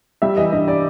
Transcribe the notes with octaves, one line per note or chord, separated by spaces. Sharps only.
G3 E5
E3 D#5
G2 D#5
D5